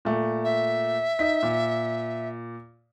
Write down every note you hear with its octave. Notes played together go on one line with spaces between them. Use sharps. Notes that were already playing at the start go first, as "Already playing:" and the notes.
A#2 A3
E5
D#4 B6
A#2